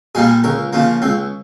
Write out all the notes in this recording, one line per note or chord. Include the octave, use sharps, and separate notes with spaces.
A#2 G3 A#3 G#4
C#2 A#4
C#3 F3 A#3
C#2 C4